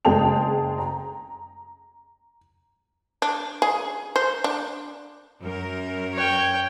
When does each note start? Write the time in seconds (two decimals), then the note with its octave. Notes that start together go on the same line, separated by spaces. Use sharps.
0.05 F#1 G#3 G#4 G5 A5 F7
0.78 A#5
3.22 D4
3.62 G#4
4.16 C5
4.44 D4
5.40 F#2 A#4
6.13 C#5 G5